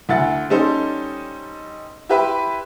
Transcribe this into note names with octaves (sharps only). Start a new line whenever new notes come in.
D2 E4 F#5 A6
G3 C#4 D#4 A4 C5
E4 G4 B4 C5 E5